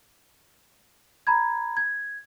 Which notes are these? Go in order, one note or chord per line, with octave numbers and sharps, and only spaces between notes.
A#5 B5 G#6
G#6